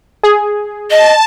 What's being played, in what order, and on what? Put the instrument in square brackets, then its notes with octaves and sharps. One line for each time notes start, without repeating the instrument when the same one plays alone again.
[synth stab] G#4
[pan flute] D#5 [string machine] A5